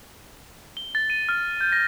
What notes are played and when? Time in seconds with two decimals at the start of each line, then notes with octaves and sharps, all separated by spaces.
0.77 G7
0.95 A6
1.10 D#7
1.29 F6
1.61 G6
1.72 A#6